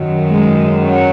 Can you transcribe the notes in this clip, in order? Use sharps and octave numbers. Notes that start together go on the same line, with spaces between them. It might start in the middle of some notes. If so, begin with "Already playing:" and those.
Already playing: F#2 D#3 F#3
G#3
F#3